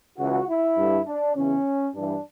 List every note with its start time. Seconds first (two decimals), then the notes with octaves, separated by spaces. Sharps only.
0.19 C#2 C#3 E3 F#4
0.48 E4
0.78 G2 D3
1.06 D4
1.36 E2 C#3 E3 C#4
1.95 G2 E3 D4